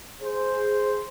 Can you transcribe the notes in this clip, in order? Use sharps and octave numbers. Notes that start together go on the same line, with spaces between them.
G#4 C5